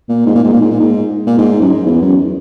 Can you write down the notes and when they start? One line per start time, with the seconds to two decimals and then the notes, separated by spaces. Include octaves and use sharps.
0.09 A#2
0.26 G#2
0.35 A#2
0.44 G#2
0.53 A#2
0.61 G#2
0.70 A#2
0.80 G#2
1.26 A#2
1.38 G#2
1.61 F#2
1.69 G#2
1.86 E2
2.02 F#2